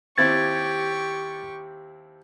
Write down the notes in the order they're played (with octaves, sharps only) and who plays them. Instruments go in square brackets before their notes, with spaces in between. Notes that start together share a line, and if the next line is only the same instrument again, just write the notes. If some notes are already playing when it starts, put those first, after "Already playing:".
[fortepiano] D#2 C4 E4 [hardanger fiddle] G4 C#6 [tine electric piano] G#6 A6